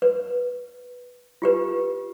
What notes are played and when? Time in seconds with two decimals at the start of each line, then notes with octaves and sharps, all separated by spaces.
0.02 B4
1.42 F4 G4 B4